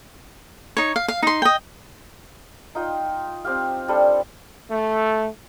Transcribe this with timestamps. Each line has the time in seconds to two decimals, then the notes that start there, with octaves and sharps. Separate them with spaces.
0.77 D#4 C#5
0.96 F5
1.08 F5
1.23 D#4 C6
1.42 D#5 G5
2.75 D#4 F4 G5
3.45 C4 G4 F5
3.88 G3 D4 A4 C5
4.71 A3